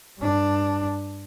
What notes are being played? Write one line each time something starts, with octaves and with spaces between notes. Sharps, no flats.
G2 D4